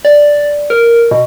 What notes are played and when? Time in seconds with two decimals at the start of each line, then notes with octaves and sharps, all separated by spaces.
0.05 D5
0.70 A#4
1.11 B2